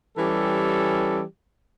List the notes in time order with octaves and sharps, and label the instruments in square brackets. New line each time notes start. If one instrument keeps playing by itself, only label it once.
[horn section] E3 G3 C#4 G4 A4